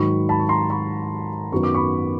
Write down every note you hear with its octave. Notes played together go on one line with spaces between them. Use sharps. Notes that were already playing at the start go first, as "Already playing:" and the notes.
Already playing: G#2 D#3 F#3 B5 C#6
A5 B5
C#6
A#5 C6
B5 C#6
F#2 D#3 F#3 B3 C#6
D6
B5 C#6